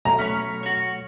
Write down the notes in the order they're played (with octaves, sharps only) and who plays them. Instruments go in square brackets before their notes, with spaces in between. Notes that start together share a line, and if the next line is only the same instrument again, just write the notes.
[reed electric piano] B2 F#3 A3 [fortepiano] A#5
[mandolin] C#4 B4 C#5
F#4 C#5